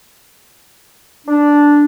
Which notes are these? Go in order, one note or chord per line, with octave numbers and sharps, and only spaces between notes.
D4